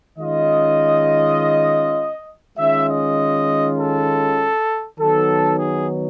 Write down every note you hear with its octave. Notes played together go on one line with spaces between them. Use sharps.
D#3 G#3 C#4 F4 D#5
D#3 G#3 C#4 F4 E5
D#5
A4
D#3 F#3 B3 D#4 A4
G#4